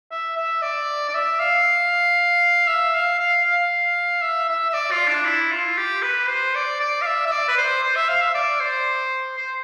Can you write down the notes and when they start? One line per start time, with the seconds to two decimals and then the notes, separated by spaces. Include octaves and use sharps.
0.11 E5
0.36 E5
0.62 D5
1.09 D5
1.14 E5
1.40 F5
2.68 E5
2.94 F5
3.19 F5
3.45 F5
4.22 E5
4.49 E5
4.69 E5
4.73 D5
4.91 F4
5.08 D4
5.25 E4
5.52 F4
5.78 G4
6.02 B4
6.28 C5
6.55 D5
6.80 D5
7.02 F5
7.06 E5
7.26 E5
7.31 D5
7.48 B4
7.57 C5
7.82 C5
7.96 E5
8.09 F5
8.22 E5
8.34 D5
8.60 C5
9.37 C5